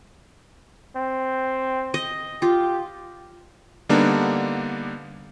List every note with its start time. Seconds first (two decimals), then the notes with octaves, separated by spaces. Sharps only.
0.96 C4
1.94 D#5
2.42 F4 G4
3.89 D3 G3 A#3 B3 D4 D#4